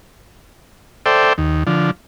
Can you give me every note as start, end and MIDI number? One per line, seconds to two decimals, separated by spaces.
1.06 1.33 69
1.06 1.33 72
1.06 1.33 74
1.06 1.33 76
1.06 1.33 79
1.38 1.63 39
1.67 1.91 50
1.67 1.91 53